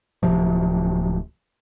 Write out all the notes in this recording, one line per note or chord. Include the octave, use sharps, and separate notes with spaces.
D1 C3 F3